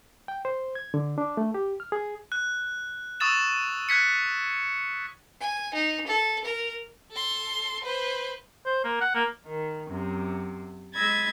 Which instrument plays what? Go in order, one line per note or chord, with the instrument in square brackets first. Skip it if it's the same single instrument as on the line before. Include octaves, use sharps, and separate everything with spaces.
[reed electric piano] G5
C5
G#6
D3
D4
A3
G4
F6
G#4
[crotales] F#6
C#6 D#6 E6 A6 E7
F#6 G#6 B6 C#7
[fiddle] G#5
D#4
A4
A#4
[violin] A4 C6
B4 C5
[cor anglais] C5
A#3
F#5
A#3
[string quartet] D#3
F#2 C3
G#3 D#5 B5 E6 G#6 A6